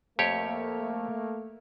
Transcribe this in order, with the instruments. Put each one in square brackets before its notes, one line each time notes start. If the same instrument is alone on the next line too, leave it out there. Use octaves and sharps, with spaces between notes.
[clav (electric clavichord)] F2 G4 C#5 [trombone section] A3 A#3